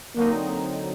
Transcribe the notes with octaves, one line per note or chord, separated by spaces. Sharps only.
D3 F#3 A#3 C4 D#4